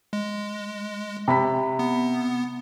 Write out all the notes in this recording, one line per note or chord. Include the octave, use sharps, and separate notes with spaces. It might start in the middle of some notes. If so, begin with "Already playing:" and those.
G#3
C3 B5 B6
B3